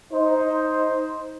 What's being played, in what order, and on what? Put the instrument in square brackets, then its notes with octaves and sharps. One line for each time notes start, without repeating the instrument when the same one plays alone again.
[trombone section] D#4 C5